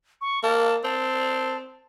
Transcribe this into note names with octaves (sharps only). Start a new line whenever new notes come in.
C#6
A#3 A5
C4 A5